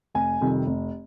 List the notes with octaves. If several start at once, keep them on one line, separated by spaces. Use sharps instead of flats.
F1 G#5
F2 C3 D#3 G3
F1